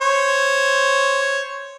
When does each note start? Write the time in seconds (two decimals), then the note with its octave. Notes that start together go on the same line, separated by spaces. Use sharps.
0.02 C5 C#5